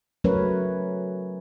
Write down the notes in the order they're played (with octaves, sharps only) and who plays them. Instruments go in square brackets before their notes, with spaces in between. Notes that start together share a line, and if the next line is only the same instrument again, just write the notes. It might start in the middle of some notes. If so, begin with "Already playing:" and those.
[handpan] F#3 A3 C#4 A#4 B4 C#5